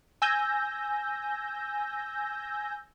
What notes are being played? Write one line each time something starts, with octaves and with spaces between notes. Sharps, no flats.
G#5 E6 G6 A#6